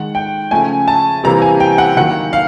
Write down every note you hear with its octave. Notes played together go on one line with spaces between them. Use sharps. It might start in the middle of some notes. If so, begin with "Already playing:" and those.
Already playing: D#3 G#3 F#5
G5
C#3 F3 A3 G#5
A5
C3 E3 G3 A#3 A#5
G#5
G5
F#5
D#3 F#3 A#3 F#5
F5